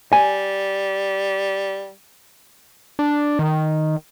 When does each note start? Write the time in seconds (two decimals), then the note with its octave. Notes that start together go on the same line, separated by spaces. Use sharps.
0.13 G3 G#5
2.99 D4
3.39 D#3